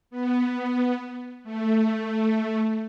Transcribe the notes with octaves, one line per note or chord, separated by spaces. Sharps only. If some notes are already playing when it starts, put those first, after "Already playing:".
B3
A3